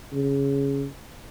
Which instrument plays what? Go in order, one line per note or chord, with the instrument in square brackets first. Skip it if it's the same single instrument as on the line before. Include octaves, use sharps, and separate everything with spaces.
[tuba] C#3